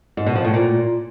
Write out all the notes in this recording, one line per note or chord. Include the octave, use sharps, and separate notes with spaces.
G#2
B2
F3
A2
A#2